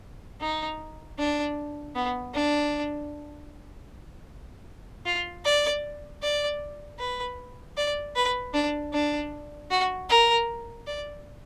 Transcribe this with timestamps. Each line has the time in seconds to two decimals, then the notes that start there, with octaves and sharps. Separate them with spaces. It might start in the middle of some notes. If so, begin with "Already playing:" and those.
0.41 D#4
1.18 D4
1.95 B3
2.34 D4
5.05 F4
5.45 D5
6.22 D5
6.99 B4
7.77 D5
8.16 B4
8.54 D4
8.93 D4
9.71 F#4
10.09 A#4
10.87 D5